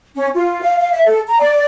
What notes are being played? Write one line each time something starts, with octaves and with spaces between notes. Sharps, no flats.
C#4
F4
F5
F5
E5
A4
A#5
D5